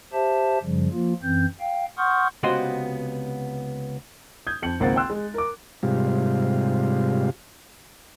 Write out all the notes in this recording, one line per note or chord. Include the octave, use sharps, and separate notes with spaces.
G4 C5 E5 A5
F#2 C#3 F3 G3
F3 A#3 F4
F#2 E3 C4 G6
F5 G5
F#5 C6 C#6 D#6 F6 G6
C#2 C3 B3 F#4 D#5 C6
D#6 G6 G#6
F2 C#7 F#7
G#1 C#2 A#3 C4 F#5 A6
G5 C6 E6 F#6
G#3
A#4 D6
G#2 C3 G3 F4